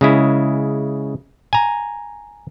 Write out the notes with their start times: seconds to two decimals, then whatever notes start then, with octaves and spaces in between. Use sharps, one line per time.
0.01 C#3 G#3 E4
1.53 G#5 A#5